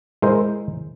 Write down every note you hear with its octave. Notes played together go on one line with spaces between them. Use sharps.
G#3 E4 A#4 C5